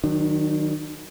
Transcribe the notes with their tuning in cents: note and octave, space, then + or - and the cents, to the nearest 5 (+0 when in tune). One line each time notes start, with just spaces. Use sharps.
D#3 +0 F#3 +0 D4 +45